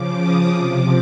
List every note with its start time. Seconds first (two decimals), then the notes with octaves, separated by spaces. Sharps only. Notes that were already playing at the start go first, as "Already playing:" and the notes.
Already playing: C#3 F3 D6
0.19 D#6
0.51 C3 F3 D6